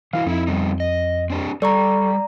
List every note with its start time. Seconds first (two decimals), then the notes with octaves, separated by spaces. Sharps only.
0.13 E3 E4 F#4 F5
0.26 F2 D#4 E4
0.47 G3 B3 D#4
0.80 D#5
1.30 C4 D4 G4
1.62 G3 A4 D5 A#5 C#6